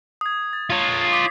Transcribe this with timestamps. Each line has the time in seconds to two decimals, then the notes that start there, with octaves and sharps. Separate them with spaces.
0.21 D#6 G#6
0.53 A6
0.70 F4 C#5
1.12 D6 B6 C7